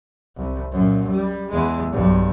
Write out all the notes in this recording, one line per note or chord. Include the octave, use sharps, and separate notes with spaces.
C2
F#2 A#2
G3
E2 G#3
B1 G2